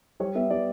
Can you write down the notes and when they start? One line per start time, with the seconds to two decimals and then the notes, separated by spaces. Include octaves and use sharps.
0.20 G3 C#5
0.35 B3 E5
0.50 G3 D5